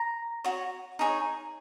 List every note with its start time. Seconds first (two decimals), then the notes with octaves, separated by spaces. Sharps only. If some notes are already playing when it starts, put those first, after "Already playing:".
Already playing: A#5
0.44 F#4 C#5
0.99 D#4 G#4 C#5